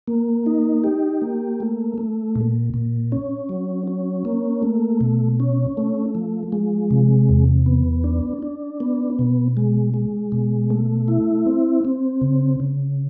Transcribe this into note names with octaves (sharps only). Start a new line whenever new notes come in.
A#3
D#4
G4
A#3
A3
A3
A#2
A#2
C#4
F#3
C#4
A#3
A3
B2
C#4
A3
F3
G#3
C3
E2
B3
D4
D4
B3
B2
G#3
G#3
B2
A3
E4
C4
C4
C#3
C#3